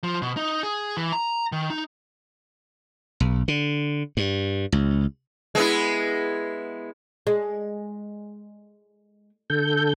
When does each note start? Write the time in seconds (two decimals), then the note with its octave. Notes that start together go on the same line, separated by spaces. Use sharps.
0.04 F3
0.22 B2
0.37 D#4
0.63 G#4
0.97 E3
1.12 A#5
1.52 D#3
1.70 D#4
3.20 B1
3.48 D3
4.17 G2
4.72 C#2
5.55 G#3 B3 E4
7.27 G#3
9.50 D3 A4 G6